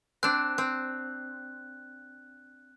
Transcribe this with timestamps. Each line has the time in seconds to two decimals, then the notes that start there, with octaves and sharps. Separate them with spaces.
0.23 C4 D4 F#6
0.58 C4